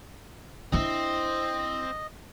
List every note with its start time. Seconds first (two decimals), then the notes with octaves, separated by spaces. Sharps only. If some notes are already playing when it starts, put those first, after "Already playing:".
0.72 C4 D4 E4 D#5